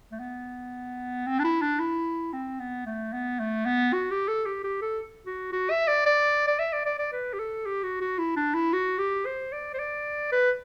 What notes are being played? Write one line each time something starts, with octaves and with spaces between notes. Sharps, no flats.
A3
B3
C4
D4
E4
D4
E4
C4
B3
A3
B3
A3
B3
F#4
G4
A4
G4
G4
A4
F#4
F#4
E5
D5
D5
D5
E5
D5
D5
D5
B4
G4
A4
G4
F#4
F#4
E4
D4
E4
F#4
G4
C5
D5
C5
D5
B4